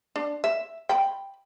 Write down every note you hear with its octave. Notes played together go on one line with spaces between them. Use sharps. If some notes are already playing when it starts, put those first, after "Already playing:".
D4
E5
G5 B5